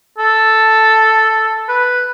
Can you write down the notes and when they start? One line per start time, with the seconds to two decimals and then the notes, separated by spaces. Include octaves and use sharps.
0.18 A4
1.69 B4